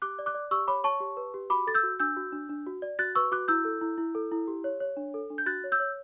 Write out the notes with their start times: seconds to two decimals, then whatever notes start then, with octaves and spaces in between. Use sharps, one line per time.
0.02 G4 D6 F#6
0.19 D5
0.26 D6 F#6
0.34 D5
0.51 G4 C#6 E6
0.68 C#5 B5 D6
0.84 C#5 A5 C#6
1.00 G4
1.17 B4
1.34 G4
1.50 F#4 B5 D6
1.67 A4 A6
1.74 E6 G6
1.83 F#4
2.00 D4 E6 G6
2.17 F#4
2.32 D4
2.49 D4
2.67 F#4
2.82 D5
2.99 F#4 F#6 A6
3.15 B4 C#6 E6
3.32 F#4 D6 F#6
3.48 E4 E6 G6
3.65 A4
3.81 E4
3.98 E4
4.15 A4
4.32 E4
4.48 G4
4.64 C#5
4.80 C#5
4.97 D4
5.14 A4
5.30 D4
5.38 G6
5.46 F#4 F#6 A6
5.64 C#5
5.72 E6 G6
5.80 C#5